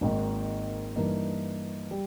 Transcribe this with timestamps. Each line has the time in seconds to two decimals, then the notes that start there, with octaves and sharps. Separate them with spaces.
0.01 G#1 G#2 D#3 A#3
0.96 G2 E3 A#3 D#4
1.91 G3